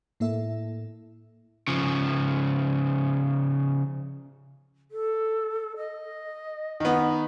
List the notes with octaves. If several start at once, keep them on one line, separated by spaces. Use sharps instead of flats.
A2 A#3 E4 A4 E5
C#3 F3
A4
D#5
D#3 B3